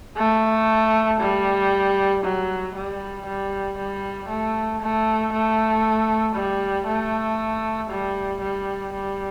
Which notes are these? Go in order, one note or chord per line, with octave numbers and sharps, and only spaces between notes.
A3
G3
F#3
G3
G3
G3
A3
A3
A3
G3
A3
G3
G3
G3